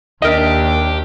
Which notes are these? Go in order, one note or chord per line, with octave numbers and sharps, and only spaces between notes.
D#2 D4 G4 A#4 D#5 E5